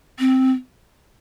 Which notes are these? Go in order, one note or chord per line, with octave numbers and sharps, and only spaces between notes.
C4